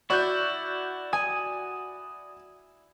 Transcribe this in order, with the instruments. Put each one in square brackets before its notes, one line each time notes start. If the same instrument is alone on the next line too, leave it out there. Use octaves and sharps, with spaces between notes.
[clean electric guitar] E4 [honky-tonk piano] F#4 D5 [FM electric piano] C#6 F#6 G6
[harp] G#5 [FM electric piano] D#6